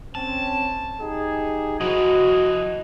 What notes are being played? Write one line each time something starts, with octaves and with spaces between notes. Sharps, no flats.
C4 C#4 A5
D#4 G4 G#4
F3 E4 F#4 D#5